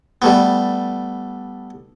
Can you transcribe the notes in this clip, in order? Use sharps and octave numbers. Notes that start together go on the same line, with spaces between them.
G3 A3 B3